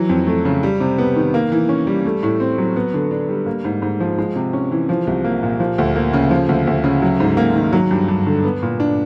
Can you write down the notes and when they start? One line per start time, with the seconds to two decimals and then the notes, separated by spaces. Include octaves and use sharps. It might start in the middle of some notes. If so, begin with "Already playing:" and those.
Already playing: E3 F#3
0.09 F2
0.27 A3
0.45 C#3
0.63 G3
0.80 C3
0.98 B3
1.16 D#3
1.34 A#3
1.52 E3
1.69 C#4
1.87 G3
2.05 A3
2.23 A2
2.40 C4
2.58 F#3
2.76 B3
2.94 D3
3.11 D4
3.29 G3
3.46 A#3
3.65 G#2
3.82 G#2
4.00 F3
4.18 G#3
4.36 C3
4.53 C#4
4.72 E3
4.89 F3
5.07 C2
5.24 A#3
5.43 A#2
5.60 F3
5.78 D2
5.95 A#3
6.13 C#3
6.31 F3
6.49 D2
6.67 D2
6.84 C#3
7.02 F#3
7.20 G#2
7.37 A#3
7.56 D#3
7.73 F#3
7.91 G2
8.08 G2
8.27 D3
8.44 B3
8.63 A#2
8.80 D4